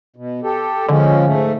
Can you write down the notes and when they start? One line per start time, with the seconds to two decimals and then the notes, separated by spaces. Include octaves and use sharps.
0.16 B2
0.43 G4 A4
0.89 D3 F3 G#3 C#4
1.26 G#2 A3